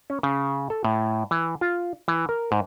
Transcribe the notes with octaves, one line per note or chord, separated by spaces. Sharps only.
C#4
C#3
A4
A2
E3
F4
E3
A#4
G#2